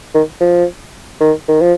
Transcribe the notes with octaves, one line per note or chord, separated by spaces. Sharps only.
D#3
F3
D#3
D#3
F3